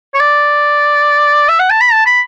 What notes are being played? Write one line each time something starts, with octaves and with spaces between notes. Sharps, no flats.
C#5
D5
E5
F#5
A5
B5
A5
B5